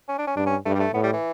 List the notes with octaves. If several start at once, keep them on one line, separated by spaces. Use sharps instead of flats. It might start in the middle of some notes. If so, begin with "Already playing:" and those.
C#4
D4
C#4
G2 D4
C#4
G2 A3
G3
A3
A2 B3
G3
E3